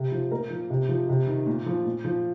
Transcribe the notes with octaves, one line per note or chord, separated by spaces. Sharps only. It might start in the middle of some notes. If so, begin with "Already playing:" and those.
Already playing: C3
F3
A#2 A#4
F3
C3
F3
C3
D#3
A#2
F3
A#2
F3